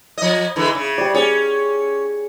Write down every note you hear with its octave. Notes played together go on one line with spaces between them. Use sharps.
F3 D#5
D3 E3 G#3
C#3
G3 D5
C#4 G#4 C#5